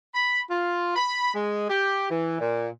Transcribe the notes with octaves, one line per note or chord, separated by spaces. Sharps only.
B5
F4
B5
G#3
G4
E3
A#2